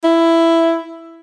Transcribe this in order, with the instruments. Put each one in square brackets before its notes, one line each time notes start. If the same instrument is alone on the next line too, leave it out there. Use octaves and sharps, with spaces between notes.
[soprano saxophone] E4